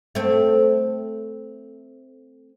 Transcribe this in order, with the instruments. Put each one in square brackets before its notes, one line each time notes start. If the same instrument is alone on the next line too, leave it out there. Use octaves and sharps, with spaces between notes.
[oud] A3 C4